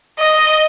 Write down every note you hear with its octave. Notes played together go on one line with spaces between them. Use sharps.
D#5